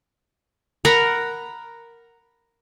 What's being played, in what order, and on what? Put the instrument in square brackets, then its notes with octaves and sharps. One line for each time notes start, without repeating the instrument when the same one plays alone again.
[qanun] A#4 F#5 A#5 B5